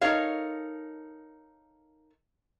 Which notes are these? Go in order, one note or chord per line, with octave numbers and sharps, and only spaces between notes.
D#4 A4 A#4 C#5 F5